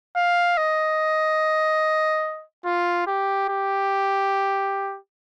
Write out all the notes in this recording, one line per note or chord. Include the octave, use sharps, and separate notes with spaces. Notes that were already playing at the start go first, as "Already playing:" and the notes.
F5
D#5
F4
G4
G4